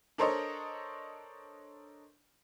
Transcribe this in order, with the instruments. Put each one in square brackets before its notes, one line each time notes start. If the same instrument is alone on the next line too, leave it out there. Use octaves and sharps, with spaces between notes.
[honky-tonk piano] D4 A4 A#4 C5 C#5 D#5